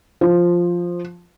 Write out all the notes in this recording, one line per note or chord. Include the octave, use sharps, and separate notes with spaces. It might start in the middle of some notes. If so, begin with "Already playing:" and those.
F3